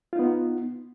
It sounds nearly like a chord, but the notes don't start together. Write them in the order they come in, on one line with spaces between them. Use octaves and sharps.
F4 D#4 B3